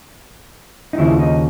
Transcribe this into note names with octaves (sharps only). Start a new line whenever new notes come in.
D#4
D#2 C#3 F3 E4
D#4